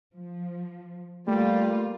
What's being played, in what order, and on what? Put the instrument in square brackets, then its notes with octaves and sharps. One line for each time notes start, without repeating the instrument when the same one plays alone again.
[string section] F3
[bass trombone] G3 [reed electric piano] A3 [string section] A#3 F4